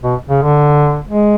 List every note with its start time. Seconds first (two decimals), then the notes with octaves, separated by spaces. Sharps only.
0.03 B2
0.29 C#3
0.42 D3
1.07 G#3